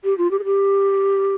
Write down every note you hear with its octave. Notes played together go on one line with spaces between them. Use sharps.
G4
F4
G4
G#4
G4